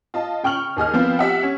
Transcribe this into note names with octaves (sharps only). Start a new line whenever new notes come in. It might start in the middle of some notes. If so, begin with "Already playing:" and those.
F4 D#5 A5
C#3 G5 C#6 F6 F#7
D#2 G#4 D#5 F6
F3 B3 C4 F4
G4 E5 F#5
C#4